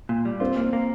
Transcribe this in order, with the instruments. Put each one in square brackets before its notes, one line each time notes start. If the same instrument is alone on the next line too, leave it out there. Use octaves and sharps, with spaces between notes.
[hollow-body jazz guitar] A#2
G3
[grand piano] C4 [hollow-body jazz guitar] F4
[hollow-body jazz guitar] A#3
A#3